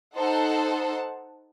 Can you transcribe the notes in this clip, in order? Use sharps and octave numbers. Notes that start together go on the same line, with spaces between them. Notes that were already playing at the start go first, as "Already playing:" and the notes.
D#4 A4 C5 F#5 A5